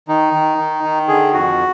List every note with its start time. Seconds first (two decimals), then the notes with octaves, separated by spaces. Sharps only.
0.08 D#3 D#4
0.33 D#3
0.58 D#3
0.84 D#3
1.08 D3 G#4
1.33 F2 F#4